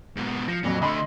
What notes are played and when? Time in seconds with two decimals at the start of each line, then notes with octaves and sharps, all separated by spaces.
0.16 G#2 B2
0.48 F3 A#6 C#7
0.64 F2 A#2 F#3
0.82 D3 A3 D#5 B5 C6